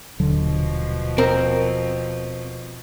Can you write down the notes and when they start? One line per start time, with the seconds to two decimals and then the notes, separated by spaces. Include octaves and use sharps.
0.20 D#1 B2 D3 F3 F#3
1.18 C4 A#4